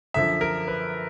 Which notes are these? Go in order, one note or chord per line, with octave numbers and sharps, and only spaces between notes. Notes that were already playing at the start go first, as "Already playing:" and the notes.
F#2 D3 F3 E5
A#4
B4